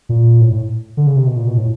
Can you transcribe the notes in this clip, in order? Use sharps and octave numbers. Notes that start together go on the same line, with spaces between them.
A#2
A2
A2
D3
C#3
C3
B2
A#2
B2
A2